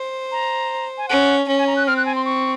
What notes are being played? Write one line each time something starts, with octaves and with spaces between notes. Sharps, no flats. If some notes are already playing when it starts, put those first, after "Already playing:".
Already playing: C5
A#5
G#5
C#4 F#5
C#4
G#5
A#5
F#6
C4 F6
F#6
G#5
C6
C#6